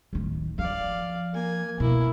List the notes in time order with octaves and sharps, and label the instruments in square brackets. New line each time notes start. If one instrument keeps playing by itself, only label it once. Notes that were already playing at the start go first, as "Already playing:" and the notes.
[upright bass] D1 D#3
[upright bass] F3 [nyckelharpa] D5 F5
[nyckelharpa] A#3 G#5
[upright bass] B2 [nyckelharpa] A#3 E4